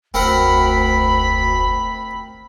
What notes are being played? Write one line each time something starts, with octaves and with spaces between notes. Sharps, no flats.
F1 D2 C4 A#4 F#5 B5